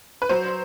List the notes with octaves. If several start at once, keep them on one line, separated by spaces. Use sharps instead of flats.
B4
F#3 C5